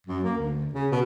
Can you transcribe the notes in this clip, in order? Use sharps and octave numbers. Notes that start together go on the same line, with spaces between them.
F#2
A#3
D2
C#3
B2